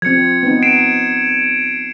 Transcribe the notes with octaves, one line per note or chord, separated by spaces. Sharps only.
F3 C4 G#6 C#7
B3 C4 D#4
C7 D7 E7